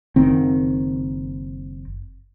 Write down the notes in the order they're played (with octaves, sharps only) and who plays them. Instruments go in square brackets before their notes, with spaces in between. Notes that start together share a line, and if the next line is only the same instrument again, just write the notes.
[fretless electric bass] F#1 D#3 C4